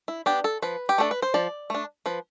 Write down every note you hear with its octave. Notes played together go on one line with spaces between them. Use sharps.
E4
B3 D4 G4
A4
F3 B4
G4
A3 D4 A4
B4
C5
F3 D5
A3 D4
F3 B4